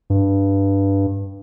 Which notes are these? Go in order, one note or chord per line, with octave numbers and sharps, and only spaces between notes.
G2